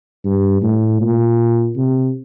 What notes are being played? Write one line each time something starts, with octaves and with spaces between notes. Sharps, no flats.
G2
A2
A#2
C3